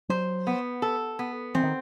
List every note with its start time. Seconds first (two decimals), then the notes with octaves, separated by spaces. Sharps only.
0.09 F#3 C5
0.47 B3
0.82 A4
1.19 B3
1.55 E3 C4
1.63 D#3